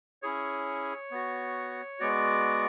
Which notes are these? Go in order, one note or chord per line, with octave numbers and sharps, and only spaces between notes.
C#4 E4 G#4 C#5
B3 F#4
G#3 B3 F#4 D5